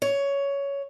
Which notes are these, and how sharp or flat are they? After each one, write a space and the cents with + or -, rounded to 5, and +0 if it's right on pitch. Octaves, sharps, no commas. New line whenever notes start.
C#5 +10